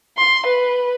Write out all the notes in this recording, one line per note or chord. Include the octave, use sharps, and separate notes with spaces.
C6
B4